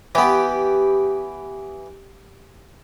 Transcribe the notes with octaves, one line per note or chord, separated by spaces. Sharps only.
E3 B3 G4